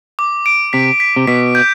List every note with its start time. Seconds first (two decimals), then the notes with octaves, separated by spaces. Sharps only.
0.19 D6
0.46 D7
0.73 C3 B6
1.00 B6
1.16 C3
1.27 B2 B6
1.55 G6